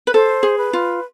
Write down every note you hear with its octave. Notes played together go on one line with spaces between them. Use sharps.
B4
A4 C5
G#4
B4
F4